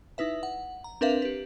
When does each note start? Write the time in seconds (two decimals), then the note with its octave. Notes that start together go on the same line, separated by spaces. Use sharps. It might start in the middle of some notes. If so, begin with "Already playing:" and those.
0.18 D#4 E4 B4 E5
0.43 F#5
0.84 A#5
1.01 C4 D4 A#4 B4 E5 F5
1.22 G4 B4